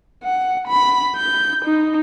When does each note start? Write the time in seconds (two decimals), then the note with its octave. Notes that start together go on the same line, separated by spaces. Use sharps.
0.24 F#5
0.68 B5
1.16 G6
1.65 D#4